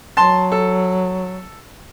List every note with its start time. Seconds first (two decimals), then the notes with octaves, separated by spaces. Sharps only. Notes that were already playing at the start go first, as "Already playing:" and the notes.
0.17 F#3 A5 C6
0.52 A4